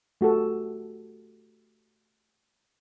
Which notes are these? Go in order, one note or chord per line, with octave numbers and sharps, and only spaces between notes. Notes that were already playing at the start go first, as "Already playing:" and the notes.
A3 F#4 G4 A4